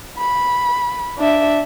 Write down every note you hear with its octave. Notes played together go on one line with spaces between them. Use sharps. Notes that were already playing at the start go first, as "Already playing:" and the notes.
B5
D4 E5